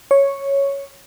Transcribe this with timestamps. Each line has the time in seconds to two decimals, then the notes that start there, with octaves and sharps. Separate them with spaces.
0.11 C#5